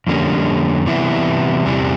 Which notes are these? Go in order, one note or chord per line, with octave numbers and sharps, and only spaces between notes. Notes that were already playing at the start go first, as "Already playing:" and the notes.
F2 D3 G3 A#3 C#4
C3 E3 G3 B3 E4
E2 C3 E3 G3